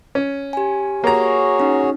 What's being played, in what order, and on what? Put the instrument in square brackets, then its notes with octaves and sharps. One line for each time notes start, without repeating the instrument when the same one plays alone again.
[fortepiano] C#4
[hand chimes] G4 G#5
[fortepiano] A#3 A#5 [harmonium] F#4 G#4 C#5
[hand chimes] C#4 D#4